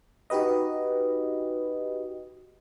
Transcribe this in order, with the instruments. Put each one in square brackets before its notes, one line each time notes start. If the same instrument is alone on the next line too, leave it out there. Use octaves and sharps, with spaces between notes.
[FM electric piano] D#4 F#4 G4 B4 D#5